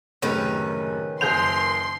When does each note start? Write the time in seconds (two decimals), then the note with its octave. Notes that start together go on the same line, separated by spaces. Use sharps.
0.22 F#1 A2 C3 D#3 C#4 B4
1.21 F#1 G#4 C5 C6 G6 F7